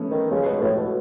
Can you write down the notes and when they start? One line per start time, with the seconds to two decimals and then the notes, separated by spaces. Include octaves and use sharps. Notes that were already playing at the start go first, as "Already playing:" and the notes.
Already playing: A3 B3 C#4
0.11 D#3
0.31 C#3 G#3
0.46 B2
0.61 A2 A3
0.76 B2 F#4